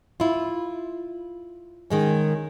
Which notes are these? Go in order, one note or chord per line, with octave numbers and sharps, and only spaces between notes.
E4 F4
D#3 G#3 C#4